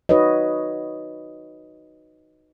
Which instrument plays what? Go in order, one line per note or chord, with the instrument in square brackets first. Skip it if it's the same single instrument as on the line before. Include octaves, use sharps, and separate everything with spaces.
[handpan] D#4 F#4 B4 C#5 D#5